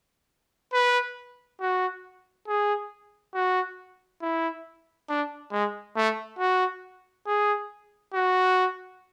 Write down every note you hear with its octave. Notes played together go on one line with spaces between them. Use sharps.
B4
F#4
G#4
F#4
E4
D4
G#3
A3
F#4
G#4
F#4